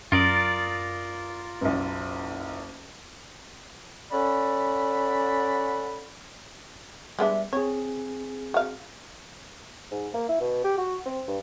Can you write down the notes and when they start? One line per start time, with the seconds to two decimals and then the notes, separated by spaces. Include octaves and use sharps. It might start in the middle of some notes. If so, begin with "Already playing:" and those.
0.12 F#2 F4 A#4 D5 D#6 D7
1.61 F#1 B1
4.11 C#4 A4 D5 F#5 B5
7.19 G3 G#3 B3 D4 E5
7.53 C4 G#4 C#5
8.54 F#4 F5
9.91 G#2
10.14 A#3
10.29 E4
10.40 B2
10.64 G4
10.78 F#4
11.06 C4
11.28 G2